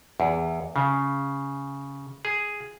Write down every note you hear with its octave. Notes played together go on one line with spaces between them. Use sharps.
E2
C#3
G#4